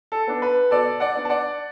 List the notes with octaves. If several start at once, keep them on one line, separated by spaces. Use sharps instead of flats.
A4
B3 D4
B4
B2 A4 D5
D5 F#5
B3 D4
A5
D5 F#5